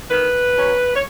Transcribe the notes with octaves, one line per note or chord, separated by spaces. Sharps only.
D#3 B4
F#3 C#4
C#5